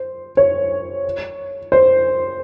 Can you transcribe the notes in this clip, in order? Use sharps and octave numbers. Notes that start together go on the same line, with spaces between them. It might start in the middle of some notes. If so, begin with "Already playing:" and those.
Already playing: C5
C#5
C5